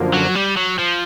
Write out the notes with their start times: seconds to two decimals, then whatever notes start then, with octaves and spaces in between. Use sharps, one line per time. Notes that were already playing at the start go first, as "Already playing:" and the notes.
Already playing: F#2 D3 F3 A#3
0.14 F#3
0.35 G3
0.57 F#3
0.78 F3